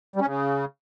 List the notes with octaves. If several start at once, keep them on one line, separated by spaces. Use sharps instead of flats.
G3
C#4
C#3